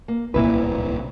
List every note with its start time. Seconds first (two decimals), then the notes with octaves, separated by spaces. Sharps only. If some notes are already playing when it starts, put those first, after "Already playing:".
0.08 A#3
0.34 D1 C2 A#2 A#3 E4 B4